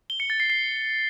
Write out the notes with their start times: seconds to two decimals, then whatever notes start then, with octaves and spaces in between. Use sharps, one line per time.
0.10 G7
0.20 C#7
0.30 A6
0.40 C7
0.50 C7